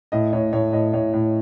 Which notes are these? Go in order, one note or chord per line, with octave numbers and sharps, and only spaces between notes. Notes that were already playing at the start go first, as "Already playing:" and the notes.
A2 D#5
A2 C#5
A2 C#5
A2 D#5
A2 C#5
A2